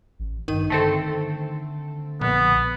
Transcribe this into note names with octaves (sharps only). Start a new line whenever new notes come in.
A1
G2 D#3 D#7
D3 A3 C4 A4
A#1 B3